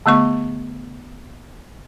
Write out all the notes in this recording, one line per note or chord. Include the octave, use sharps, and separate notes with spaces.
D3 A3 B3 C#6